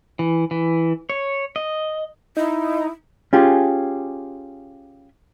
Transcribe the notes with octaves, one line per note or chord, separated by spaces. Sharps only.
E3
E3
C#5
D#5
D#4 E4
C#4 F4 G4 G#4